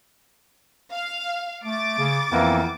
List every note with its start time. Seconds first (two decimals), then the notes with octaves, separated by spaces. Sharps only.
0.92 F5
1.64 A3 D6 A6
1.99 C#3
2.31 F2 E3 A#3 B3